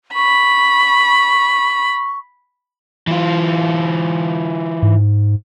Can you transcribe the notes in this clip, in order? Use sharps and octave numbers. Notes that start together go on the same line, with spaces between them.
B5 C#6
E3 F4
G#2